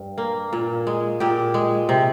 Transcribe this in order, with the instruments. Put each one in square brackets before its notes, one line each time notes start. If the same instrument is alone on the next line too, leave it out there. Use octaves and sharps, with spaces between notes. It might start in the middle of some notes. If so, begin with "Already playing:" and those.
Already playing: [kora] G2
A#3
A#2
G#3
A#2 G4
G#3
C3